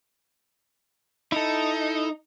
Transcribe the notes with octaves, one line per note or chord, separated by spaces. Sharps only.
D#4 E4 A4